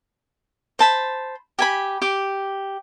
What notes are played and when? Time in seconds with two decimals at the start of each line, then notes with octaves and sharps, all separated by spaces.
0.79 C5 A5 B5
1.59 G4 G#5 B5
2.02 G4 D6